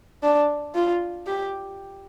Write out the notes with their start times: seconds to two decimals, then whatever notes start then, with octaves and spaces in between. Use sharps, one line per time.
0.23 D4
0.75 F4
1.27 G4